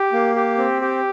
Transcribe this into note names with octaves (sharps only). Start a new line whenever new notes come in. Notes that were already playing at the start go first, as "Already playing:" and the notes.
Already playing: G4
A#3
G4
C4
G4